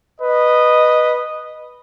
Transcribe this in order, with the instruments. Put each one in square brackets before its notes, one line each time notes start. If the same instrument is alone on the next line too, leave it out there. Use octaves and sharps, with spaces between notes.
[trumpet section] B4 D#5